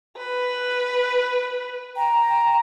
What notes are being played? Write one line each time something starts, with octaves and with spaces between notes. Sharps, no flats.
B4
G5 A#5